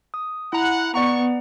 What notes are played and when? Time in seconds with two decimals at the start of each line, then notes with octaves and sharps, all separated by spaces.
0.14 D#6
0.53 E4 F#5 A#5
0.94 B3 D5 F#5 A#5 C#6